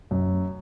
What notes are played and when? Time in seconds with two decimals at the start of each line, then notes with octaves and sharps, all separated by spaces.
0.11 F#2